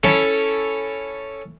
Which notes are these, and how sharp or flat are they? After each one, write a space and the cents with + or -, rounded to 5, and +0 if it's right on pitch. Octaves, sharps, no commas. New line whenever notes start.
C#4 +0 E4 +0 A4 +0